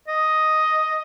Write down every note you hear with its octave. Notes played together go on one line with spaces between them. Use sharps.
D#5